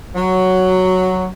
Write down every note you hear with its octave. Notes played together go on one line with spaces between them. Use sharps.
F#3